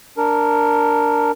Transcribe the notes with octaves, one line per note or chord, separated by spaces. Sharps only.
D4 A#4